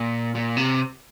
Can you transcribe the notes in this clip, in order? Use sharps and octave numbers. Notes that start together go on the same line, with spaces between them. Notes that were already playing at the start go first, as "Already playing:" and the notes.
Already playing: A#2
A#2
C3